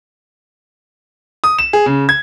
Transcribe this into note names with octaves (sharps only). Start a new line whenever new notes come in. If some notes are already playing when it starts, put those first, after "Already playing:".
D#6
E7
G#4
C#3
G#6